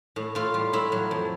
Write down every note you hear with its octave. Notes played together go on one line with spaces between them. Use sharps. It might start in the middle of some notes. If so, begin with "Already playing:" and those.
A2
A2 F4
G3 F4
A2 E4
F#3
F2